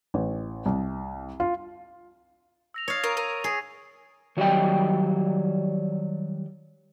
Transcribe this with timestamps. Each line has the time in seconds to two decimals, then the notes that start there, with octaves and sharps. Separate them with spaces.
0.14 A1
0.66 C2
1.40 F4
2.74 E6 A#6 F7
2.88 C#5 F5 D#6 A6
3.04 A#4 C#6 D#6 D#7
3.17 A#4 D#7
3.44 G#4
4.37 D#3 F#3 G3 C#5 D#5 G5